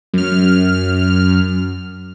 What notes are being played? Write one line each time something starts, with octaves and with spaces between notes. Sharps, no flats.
F#2 F6